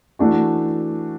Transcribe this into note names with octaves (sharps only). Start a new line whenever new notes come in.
E3 A3 D4 F#4